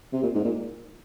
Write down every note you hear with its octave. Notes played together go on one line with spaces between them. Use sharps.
C3
A#2
G#2
A#2